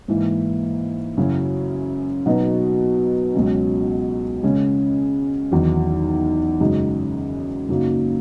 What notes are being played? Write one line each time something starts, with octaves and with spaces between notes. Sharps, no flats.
G#2 E3 A#3 E4
F#2 C#3 F#3 C#4 E4
B2 F#3 B3 D#4
C#2 B2 F#3 C#4
C#3 G#3 C#4
E2 D#3 F#3
F#2 C#3 G#3 D#4
F#2 C#3 F#3 A#3 D#4